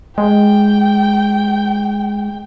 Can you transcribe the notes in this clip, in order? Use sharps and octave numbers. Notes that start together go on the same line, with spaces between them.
G#3 G5